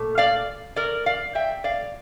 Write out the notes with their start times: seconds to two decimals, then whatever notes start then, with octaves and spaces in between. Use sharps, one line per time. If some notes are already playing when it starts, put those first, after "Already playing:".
Already playing: A#2 A3
0.18 D5 F5
0.76 A#4 D5
1.06 D5 F5
1.35 E5 G5
1.64 D5 F5